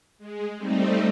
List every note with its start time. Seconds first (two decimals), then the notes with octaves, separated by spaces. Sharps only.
0.18 G#3
0.57 G3 A3 C4 D#4